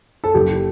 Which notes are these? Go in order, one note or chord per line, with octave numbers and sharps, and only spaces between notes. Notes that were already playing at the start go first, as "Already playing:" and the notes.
A4
F#1 G4